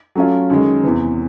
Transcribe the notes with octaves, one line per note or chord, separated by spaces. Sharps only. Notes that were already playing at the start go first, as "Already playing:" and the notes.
F#3 A3 C#4 F4
F#2 D#3 G#3
E2 C3 E3